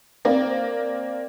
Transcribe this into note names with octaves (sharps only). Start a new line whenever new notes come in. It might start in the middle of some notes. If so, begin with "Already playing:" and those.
A#3 C4 D5